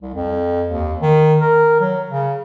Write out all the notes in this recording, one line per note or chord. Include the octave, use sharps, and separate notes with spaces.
C2
F2
D#2
D#3
A#4
F#3
C#3